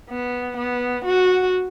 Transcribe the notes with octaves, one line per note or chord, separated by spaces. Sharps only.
B3
B3
F#4